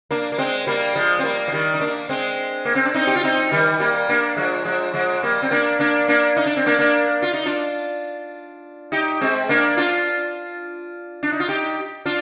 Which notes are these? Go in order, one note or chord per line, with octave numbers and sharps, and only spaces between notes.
A#3 D4
A#3
G#3 C4
G3 A#3
F3 G#3
C4
G3 A#3
F3
D#3 G3
D#4
A#3 D4
G#3 C4
A#3
C4
D4
C4 D#4
G4
F4
C4 D#4
D#3 G3
G3 A#3
A#3 D4
F3 G#3
F3 G#3
F3 G#3
G3 A#3
C4
A#3 D4
A#3 D4
A#3 D4
D#4
D4
C4
A#3 D4
A#3 D4
F4
D#4
D4 F4
D#4 G4
G#3 C4
A#3 D4
D4 F4
D4
D#4
F4
D#4 G4
D4 F4